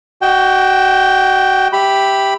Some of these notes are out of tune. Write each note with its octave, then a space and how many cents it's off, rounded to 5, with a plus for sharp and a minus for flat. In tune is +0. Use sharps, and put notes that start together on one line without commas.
F#4 +25 D#5 +0 G5 +0
G4 +0 E5 +0 B5 +0